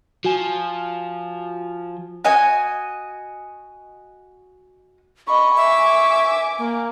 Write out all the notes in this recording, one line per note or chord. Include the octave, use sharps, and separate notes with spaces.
F3 F#4 G#5
F#4 D#5 G#5
D#5 B5 C#6
E5 G#5 D6
A#3